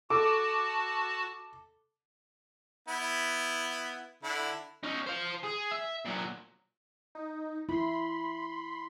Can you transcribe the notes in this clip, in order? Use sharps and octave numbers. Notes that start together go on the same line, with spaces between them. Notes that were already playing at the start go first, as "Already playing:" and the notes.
F#4 A4 A5 D6
B3 E4
D3 E4
C#4 D#4
C5 F5
G#4
E5
A#2 F#3
D#4
E4 B5 C6